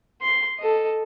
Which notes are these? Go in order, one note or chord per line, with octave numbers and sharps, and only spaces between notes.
C6
A4 D#5